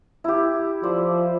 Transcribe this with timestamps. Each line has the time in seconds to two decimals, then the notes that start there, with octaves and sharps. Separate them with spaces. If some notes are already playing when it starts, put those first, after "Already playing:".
0.24 E4 G4
0.83 F3 C5 D5